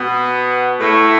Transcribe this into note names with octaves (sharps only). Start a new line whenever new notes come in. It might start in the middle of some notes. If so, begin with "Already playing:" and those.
Already playing: B2 B3
A2 A3